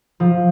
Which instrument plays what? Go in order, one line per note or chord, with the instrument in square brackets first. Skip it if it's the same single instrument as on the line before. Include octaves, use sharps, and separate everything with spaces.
[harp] F3